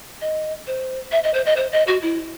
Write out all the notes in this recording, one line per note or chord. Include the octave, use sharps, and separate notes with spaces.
D#5
C5
E5
D#5
C5
D#5
C5
D#5
F#4
E4